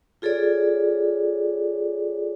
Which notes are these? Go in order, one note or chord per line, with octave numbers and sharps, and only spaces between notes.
F4 G#4 A4 C#5 D5